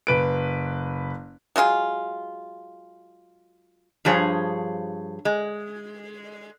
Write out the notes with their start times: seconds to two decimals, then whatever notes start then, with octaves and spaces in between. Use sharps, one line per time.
0.07 F#1 B4 D7
1.56 F#3 G#3 F4 G#4
4.05 G2 F3 G#4 C5 C#5
5.25 G#3